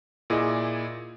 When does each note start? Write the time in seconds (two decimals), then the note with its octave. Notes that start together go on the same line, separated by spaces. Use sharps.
0.30 A#2 E4 G#4 D5 D#5